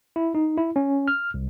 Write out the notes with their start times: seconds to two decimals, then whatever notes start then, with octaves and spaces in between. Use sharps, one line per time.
0.16 E4
0.35 D#4
0.57 E4
0.76 C#4
1.08 F6
1.34 C2